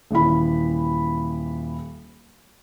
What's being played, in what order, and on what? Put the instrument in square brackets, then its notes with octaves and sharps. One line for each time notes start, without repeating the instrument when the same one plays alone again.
[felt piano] D#1 E3 B5